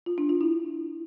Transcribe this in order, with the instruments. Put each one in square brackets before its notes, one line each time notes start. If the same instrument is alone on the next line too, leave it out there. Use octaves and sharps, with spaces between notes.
[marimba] F4
D4
F4
E4